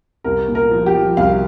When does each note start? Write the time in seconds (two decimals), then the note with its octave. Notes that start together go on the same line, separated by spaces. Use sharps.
0.24 C2 A#4
0.48 A#2
0.55 A#4
0.71 F3
0.86 G4
0.95 F3
1.17 C2 F5